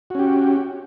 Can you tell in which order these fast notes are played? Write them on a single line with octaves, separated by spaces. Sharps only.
F#4 C#4 G4